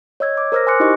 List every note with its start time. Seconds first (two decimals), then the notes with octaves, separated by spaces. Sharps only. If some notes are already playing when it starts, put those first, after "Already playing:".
0.20 C#5 D#5 E6 G#6
0.37 D6
0.52 A#4 C5 E6 F6 A#6
0.67 G#5 C6 D6 F#6 C#7
0.80 D#4 E4 F#4 G4 D#5 C#6